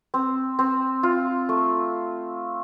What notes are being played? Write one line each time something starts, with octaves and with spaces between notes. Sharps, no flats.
C4
C4
F4
A3